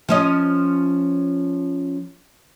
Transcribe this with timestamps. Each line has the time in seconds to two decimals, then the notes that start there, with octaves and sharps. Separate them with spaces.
0.09 F3 C#4 D#5